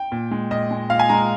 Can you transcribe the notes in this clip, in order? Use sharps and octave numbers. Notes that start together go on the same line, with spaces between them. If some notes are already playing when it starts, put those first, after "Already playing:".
Already playing: G5
A#2
G#3
A#2 D#5
G#3
A#2 F5
G#5
G#3 A#5